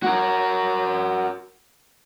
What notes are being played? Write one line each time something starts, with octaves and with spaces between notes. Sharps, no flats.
F#4 A#4